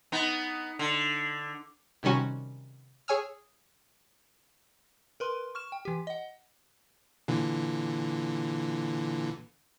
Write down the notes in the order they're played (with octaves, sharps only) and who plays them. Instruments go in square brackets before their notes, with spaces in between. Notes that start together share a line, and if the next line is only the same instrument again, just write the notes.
[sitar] B3 D#4
D3
[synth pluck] C3 D#3 G3 C#4 F#4
G#4 C#5 G#5 E6 F6
[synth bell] A#4 B4 C6
C#6 F6 E7
G5
E3 G4
D#5 F#5
[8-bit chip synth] A#2 D3 E3